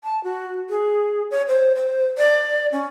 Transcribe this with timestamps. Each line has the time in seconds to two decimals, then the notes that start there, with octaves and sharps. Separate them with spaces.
0.04 A5
0.24 F#4
0.70 G#4
1.31 C#5
1.48 C5
1.75 C5
2.18 D5
2.72 C#4